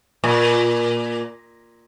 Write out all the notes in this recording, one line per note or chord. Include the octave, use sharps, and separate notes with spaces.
A#2